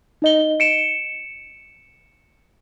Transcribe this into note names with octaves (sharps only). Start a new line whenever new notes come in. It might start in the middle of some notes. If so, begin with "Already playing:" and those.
D#4 D#5 G7
C#7 D7 E7